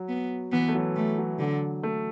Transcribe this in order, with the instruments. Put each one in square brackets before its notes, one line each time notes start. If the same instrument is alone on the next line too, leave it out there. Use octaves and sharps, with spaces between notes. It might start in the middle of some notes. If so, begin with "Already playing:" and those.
Already playing: [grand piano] F#3
[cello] B3
[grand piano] E3 [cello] B3
[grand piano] A3
F#3
[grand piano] E3 [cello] A3
[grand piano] F#3
[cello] D3 [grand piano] F#3
[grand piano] A3